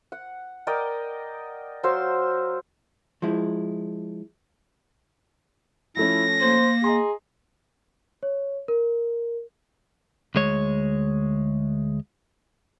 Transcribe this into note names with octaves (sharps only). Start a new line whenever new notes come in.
F#5
A#4 D5 D#5 G5
F#3 C5 F5 E6
F3 G#3 E4
F3 A3 C#4 E4 A#6
A#3 C5
G#4 D#5 A#5 C6
C#5
A#4
D2 G#3 C#5